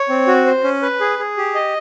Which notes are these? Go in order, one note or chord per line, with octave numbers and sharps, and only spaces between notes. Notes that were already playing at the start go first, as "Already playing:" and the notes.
Already playing: C#5
C4
F#4
C5
C#4
B4
G#4
G#4
G4
D#5